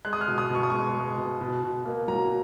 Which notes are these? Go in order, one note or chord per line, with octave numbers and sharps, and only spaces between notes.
G#3 F#6
D#6
F6
B2
D#6
B2 C#6
D#6
G#3 C#6
G#3
B2
B2
B2
A#3
F#3 A#5